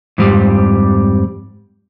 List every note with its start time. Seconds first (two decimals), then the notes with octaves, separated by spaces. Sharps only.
0.18 F2 G#2 G3